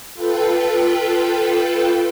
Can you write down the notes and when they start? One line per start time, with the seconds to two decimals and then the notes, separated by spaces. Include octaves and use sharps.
0.14 F4 A4 B4 G5